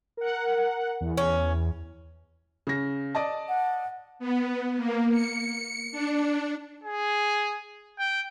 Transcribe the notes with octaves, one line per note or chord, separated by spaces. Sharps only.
A#4 F#5
E2
C#4
C#3 A#6
D5 D#5 A5
F#5
B3
A#3
C#7
D4
G#4
G5